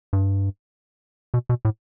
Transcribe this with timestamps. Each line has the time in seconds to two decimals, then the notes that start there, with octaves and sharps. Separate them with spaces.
0.13 G2
1.34 B2
1.49 B2
1.65 A2